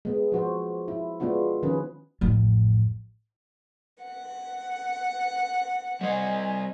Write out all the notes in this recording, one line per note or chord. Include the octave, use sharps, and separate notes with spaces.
G#3 B3
F3 F#4 C5
E4
G#3 B3 D4 F4 F#4
D#3 F3 C#4 G#4 B4
A1 F2
F#5
G3 C4 C5 D#5 G#5